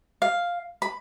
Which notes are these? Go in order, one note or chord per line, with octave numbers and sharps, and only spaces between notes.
F5
B5